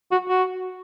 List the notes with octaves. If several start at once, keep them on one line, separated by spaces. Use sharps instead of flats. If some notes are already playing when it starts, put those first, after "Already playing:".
F#4
F#4